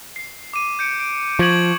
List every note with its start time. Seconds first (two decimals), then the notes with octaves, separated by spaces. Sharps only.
0.16 C7
0.53 D6 D#7
0.79 G6 C#7 D7
1.00 D7
1.39 F3 C#6 G#6 F#7